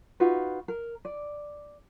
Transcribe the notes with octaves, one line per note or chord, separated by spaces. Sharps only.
D#4 F4 F#4 B4
A#4
D5